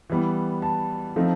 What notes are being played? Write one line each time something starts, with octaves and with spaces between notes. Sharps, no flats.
E3 G3 B3
A5
F3 A3 C4 D#4